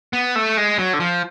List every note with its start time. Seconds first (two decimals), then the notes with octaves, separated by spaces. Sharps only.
0.13 B3
0.36 A3
0.57 G#3
0.79 F#3
0.93 D3
1.00 F3